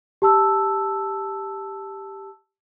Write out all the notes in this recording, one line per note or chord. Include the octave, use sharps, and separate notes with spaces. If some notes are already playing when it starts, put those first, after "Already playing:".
G4 A5 E6